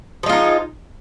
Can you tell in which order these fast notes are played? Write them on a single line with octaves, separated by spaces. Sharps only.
F3 G#3 F4 D#4